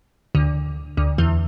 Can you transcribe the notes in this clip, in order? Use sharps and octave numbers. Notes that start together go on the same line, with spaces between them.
D2 D3
D2 D3
E2 E3